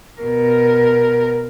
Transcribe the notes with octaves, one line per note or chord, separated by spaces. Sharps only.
B2 A#4